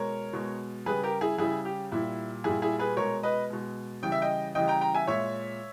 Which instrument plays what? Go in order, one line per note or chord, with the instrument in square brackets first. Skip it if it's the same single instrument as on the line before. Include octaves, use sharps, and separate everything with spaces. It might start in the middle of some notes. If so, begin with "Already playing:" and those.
Already playing: [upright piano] B2 G#3 A#4 C#5
B2 G#3
C#3 G3 G#4 B4
G4 A#4
E4 G#4
C#3 G3 E4 G#4
G4
A#2 G3 E4
A#2 G3 E4 G#4
E4 G#4
G#4 B4
B2 G#3 A#4 C#5
B4 D#5
B2 G#3
C#3 E3 G3 G5
E5
D#5 G5
C#3 E3 G3 D#5 G5
G5 A#5
G5 A#5
E5 G#5
A#2 G#3 C#5 E5